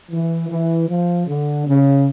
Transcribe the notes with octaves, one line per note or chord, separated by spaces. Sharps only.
E3
E3
F3
D3
C#3